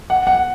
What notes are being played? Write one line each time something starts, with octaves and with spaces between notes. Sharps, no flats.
F#5
F#5